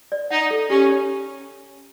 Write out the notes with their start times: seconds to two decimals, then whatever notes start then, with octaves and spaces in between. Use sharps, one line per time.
0.12 D5
0.31 D#4 F#5
0.51 A4
0.70 C#4 G4
0.89 C#4